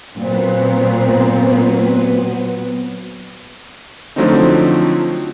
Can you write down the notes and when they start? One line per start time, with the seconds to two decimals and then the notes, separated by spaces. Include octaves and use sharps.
0.14 A#2 F#3 B3 C4 B4
4.16 D3 F3 F#3 A3 C4 D#4